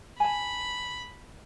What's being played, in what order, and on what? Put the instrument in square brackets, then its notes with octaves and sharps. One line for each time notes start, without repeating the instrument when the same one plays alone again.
[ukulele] G#5 A5 [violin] B5